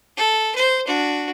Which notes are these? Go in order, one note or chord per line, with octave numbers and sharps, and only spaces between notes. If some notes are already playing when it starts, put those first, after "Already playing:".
A4
C5
D4 F#4